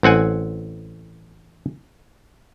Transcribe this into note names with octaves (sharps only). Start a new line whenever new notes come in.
A1 C4 F#5 G#5